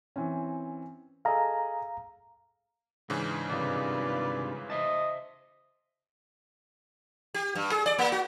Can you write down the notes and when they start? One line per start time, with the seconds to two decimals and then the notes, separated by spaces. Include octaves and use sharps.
0.16 E3 C4 C#4
1.25 G#4 A4 D#5 F5 A#5
3.10 G#2 C#3 E3 D4
3.49 G2 C3 D#3 F4 B4 D5
4.70 C5 D#5 E5 A5
7.34 G4
7.55 G2
7.71 G#4
7.86 D5
7.99 A#3
8.12 F#4